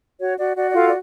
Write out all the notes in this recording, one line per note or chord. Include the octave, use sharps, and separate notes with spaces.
F#4 C#5
F#4 D5
F#4 D5
D5
F4 A4 F5
D5